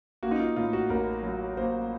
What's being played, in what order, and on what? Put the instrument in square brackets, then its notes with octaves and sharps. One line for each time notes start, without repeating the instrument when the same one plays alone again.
[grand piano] A#3 F#4
D#4
F4
A2 F4
F#4
A1 A#4
F#3
A#3 C5